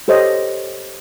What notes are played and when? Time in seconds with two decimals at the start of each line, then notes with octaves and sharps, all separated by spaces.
0.08 G4 A4 C5 C#5 D#5